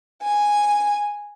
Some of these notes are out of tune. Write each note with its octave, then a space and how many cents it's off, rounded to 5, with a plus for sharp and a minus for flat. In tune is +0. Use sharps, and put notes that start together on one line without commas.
G#5 -5